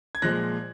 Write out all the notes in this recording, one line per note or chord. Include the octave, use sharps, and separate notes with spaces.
G#6
A#2 F3 G#3 F#6 A#6